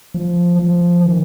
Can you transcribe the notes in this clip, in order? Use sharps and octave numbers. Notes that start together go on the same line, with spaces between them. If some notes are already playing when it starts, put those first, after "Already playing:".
F3
F3
D#3